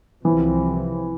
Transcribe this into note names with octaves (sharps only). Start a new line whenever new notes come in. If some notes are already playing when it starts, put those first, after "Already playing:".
C2 C3 E3 F3 C4